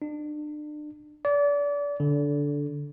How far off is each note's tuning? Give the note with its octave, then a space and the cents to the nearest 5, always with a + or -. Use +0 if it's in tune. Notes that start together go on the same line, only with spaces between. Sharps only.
D4 +35
D5 -30
D3 -15